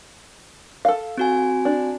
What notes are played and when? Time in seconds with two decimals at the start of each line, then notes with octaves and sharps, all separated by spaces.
0.85 A4 F5
1.18 C4 F#4 G#5
1.65 D4